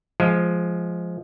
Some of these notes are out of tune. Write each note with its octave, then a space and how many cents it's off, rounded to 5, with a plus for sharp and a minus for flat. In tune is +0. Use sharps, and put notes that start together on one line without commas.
F3 +0 G#3 +10